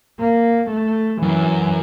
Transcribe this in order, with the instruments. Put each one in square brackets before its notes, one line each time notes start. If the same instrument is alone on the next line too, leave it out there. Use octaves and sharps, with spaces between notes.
[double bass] A#3
A3
[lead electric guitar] F#2 [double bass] E3